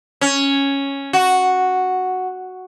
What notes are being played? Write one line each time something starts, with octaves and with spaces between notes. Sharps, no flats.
C#4
F#4